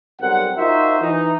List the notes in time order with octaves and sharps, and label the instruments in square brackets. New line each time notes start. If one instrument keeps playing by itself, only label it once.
[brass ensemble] B1 G3 C4 A#4 F#5
D#4 F4 F#4 A#4 C5 E5
E3 D#4